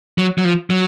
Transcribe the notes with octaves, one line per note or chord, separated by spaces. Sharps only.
F#3
F#3
F3
F#3